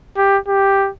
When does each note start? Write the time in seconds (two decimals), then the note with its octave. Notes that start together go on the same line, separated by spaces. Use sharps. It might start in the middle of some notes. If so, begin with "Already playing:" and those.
0.17 G4
0.48 G4